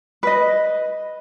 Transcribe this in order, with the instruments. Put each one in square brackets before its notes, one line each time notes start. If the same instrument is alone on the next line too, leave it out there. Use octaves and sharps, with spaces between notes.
[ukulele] B4 D#5